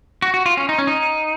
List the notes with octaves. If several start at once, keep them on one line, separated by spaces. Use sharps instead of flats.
F#4
F#4
F4
C#4
D#4
C#4
D#4